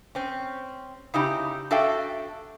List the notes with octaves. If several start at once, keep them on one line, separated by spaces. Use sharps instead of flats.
C4 C#4
C#3 D#4 E4 G4
D4 F#4 A4 E5 F5 G5